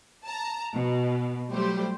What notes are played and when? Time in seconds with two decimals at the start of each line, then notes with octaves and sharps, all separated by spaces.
0.25 A5 A#5
0.74 B2
1.51 F#3 G3 A3 G4 C5